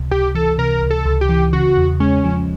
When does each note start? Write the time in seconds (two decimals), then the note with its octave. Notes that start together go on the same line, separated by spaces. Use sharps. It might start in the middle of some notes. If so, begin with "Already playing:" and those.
Already playing: C#2 C3
0.11 C#2 G4
0.35 E3 A4
0.58 C3 A#4
0.82 C#2
0.90 A4
1.06 C#2
1.21 G4
1.29 E3
1.53 C#3 F#4
1.77 E2
2.00 G#3 C#4
2.24 F3